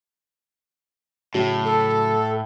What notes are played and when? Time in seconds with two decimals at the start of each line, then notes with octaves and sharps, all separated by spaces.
1.34 A2 C#3 F#3
1.64 A4